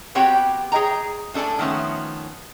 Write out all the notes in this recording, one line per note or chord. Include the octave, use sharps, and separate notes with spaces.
B3 C4 F#4 G4 C#5 G5
G#4 C#5 D#5 G5 A#5
A2 D4 A4 D5 G#5
D#3 F3 A3 B3 C#4